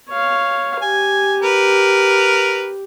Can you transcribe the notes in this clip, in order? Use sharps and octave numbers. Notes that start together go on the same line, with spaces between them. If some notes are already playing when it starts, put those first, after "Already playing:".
C#5 F5
G4 G#5
A#4 B4